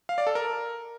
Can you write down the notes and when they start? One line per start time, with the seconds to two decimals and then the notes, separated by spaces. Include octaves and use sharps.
0.09 F5
0.18 D5
0.27 A4
0.35 A#4